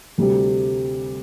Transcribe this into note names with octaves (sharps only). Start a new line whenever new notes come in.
D2 C3 G3